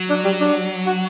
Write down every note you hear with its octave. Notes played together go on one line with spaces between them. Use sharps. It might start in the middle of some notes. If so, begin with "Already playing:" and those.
Already playing: F#3
D4
G3
D4
F#4